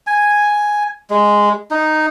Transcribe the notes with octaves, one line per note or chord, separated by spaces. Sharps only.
G#5
G#3
D#4